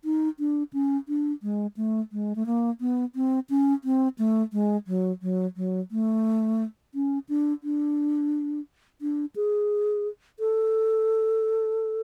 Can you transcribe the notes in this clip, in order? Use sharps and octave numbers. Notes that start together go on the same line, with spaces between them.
D#4
D4
C#4
D4
G#3
A3
G#3
A3
A#3
B3
C4
C#4
C4
A3
G#3
F#3
F#3
F#3
A3
C#4
D4
D4
D4
G#4
A4